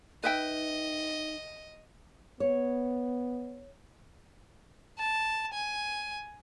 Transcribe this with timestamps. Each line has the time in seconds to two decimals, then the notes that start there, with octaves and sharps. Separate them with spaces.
0.24 D#4 B4 D#5 E5 G5
2.40 B3 C#5
4.99 A5
5.53 G#5